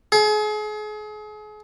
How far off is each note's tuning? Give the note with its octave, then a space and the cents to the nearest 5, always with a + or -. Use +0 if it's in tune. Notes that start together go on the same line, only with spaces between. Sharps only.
G#4 +35